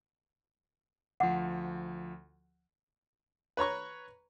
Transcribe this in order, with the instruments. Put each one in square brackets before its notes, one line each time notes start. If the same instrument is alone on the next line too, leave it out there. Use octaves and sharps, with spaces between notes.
[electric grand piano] D2 F3 [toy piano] F#5
[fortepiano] B4 C#5 A#5 C#6